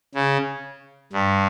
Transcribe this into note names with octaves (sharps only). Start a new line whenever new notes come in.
C#3
G2